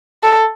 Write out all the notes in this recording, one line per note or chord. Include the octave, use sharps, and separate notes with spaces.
A4